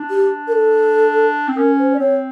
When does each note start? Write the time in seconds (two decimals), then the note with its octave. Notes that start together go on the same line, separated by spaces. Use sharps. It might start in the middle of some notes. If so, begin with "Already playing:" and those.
Already playing: D4
0.10 G4
0.47 A#4
0.52 A4
1.49 C4
1.57 C#4 A#4
1.79 C5
1.93 D5
1.99 C4 C#5